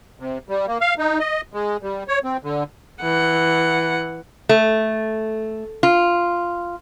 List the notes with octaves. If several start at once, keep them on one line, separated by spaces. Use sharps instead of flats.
C3
G3
A#3
F5
D#4
D#5
G#3
G3
C#5
C4
D3
E3 F#5
A3
F4